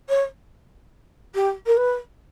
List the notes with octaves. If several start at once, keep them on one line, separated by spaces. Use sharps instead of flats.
C#5
G4
A#4
B4